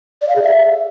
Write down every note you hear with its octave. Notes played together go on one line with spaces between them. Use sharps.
D5
F5
G#4
E5